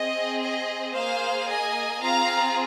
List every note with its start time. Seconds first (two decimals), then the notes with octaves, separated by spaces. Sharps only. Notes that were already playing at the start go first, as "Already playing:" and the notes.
Already playing: C4 G#4 D#5
0.41 D#5
0.94 A#3 G#4 C5 F5
1.48 D#5 G#5
2.02 C4 F4 G#4 F5 A#5